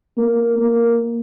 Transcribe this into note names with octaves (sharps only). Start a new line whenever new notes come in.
A#3
A#3